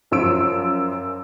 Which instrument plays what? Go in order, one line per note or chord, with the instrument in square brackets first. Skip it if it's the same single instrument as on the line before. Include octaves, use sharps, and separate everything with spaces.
[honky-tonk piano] F#2 F3 E6 D7